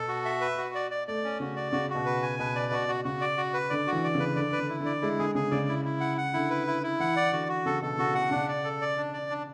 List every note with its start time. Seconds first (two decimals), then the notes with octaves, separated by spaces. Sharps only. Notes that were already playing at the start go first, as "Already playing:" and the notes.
Already playing: B2 A4
0.08 F#4
0.25 E5
0.41 B4
0.58 F#4
0.75 D5
0.91 D5
1.08 A3 D5
1.24 C#4
1.40 C#3 F#4
1.56 D5
1.73 C#3 F#4
1.90 F#4
1.95 B2
2.06 B4
2.22 G#5
2.39 B2 B4
2.55 D5
2.71 B2 F#4
2.88 F#4
3.05 C#3 F#4
3.21 D5
3.37 F#4
3.54 B4
3.70 D3 D5
3.87 F#4
3.92 E3
4.04 D5
4.15 C#3
4.20 B4
4.36 D3 D5
4.52 B4
4.59 D3
4.69 E4
4.80 D3
4.85 D5
5.02 G#3 E4
5.19 D3 G#4
5.35 C#3 G#4
5.51 C#3 D5
5.69 E4
5.85 E4
6.01 F#5
6.18 F#5
6.33 D3 E4
6.50 B4
6.67 E4
6.83 E4
7.00 E3 F#5
7.16 D5
7.32 D3 F#4
7.49 F#4
7.66 C#3 A4
7.82 B2 A4
7.99 C#3 F#4
8.15 B2 F#5
8.31 C#3 D4
8.48 D5
8.64 A4
8.81 D5
8.98 D4
9.13 D5
9.30 D4